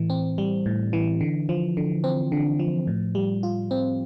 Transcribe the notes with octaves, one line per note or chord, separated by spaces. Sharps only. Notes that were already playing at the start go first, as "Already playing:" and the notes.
Already playing: A2 E3
C4
G3
A2
E3
D3
F3
D3
C4
D3
F3
A2
G3
F4
C4